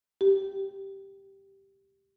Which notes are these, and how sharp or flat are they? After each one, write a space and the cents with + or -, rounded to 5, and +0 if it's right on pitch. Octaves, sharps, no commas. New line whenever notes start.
G4 -5